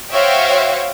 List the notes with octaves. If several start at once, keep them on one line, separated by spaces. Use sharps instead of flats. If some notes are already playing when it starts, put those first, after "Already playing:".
F#4 C5 C#5 E5 F5 G5